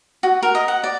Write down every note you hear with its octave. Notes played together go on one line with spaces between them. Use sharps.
F#4
A#4
D#5
F#5
D5